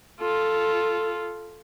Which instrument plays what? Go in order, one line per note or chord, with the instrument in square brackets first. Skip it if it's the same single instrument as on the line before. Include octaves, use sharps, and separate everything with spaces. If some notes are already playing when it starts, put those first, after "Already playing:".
[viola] F4 A4